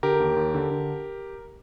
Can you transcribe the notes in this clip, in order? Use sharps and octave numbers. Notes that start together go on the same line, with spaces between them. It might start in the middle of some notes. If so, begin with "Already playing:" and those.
D3 G4 A#4
D#2
D#2
D3
D3